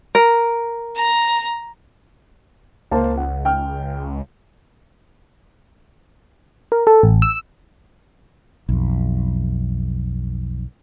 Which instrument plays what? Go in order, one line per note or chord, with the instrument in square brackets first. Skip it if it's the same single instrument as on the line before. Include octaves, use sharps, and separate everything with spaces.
[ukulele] A#4
[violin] A#5
[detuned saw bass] C#2 [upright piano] A#3 C5 A5
[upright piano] F#5
G5 F6
[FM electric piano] A#4
A4
A1
E6
[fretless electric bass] B1 F2